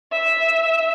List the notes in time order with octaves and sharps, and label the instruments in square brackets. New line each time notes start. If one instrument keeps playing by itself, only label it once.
[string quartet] E5